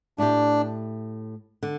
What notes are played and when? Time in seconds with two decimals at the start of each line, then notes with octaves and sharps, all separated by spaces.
0.18 A2 A3 D4 E4 G4
1.63 D3